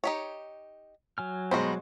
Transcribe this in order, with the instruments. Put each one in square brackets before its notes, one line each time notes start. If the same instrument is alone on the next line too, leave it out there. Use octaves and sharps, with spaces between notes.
[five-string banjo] D#4 G4 C#5
[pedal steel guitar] F#3 G#5 F6
[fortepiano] B2 G#3 C5 [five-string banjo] G3 D#4 F#4